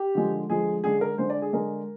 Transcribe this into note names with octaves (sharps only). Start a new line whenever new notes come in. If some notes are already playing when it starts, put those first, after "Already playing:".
Already playing: G4
D3 F3 G#3
D3 F3 G#3 G#4
D3 G#3 D4 G#4
A#4
D3 G#3 D4 C5
D5
G#4
D3 G#3 D4 A#4